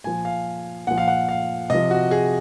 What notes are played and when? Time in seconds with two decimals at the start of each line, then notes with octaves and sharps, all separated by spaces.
0.04 A#2 F3 G#5
0.25 F5
0.87 A#2 F3 F#5
0.98 F5
1.08 F#5
1.29 F5
1.70 C3 F3 D#5
1.91 F#4
2.11 G#4